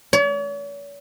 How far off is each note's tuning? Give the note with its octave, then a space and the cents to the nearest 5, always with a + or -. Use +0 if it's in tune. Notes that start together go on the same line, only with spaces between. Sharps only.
C#5 +45